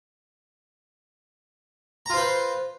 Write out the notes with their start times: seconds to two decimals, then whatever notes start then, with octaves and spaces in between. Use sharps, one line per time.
2.06 A#5
2.10 F4
2.13 C5
2.17 B4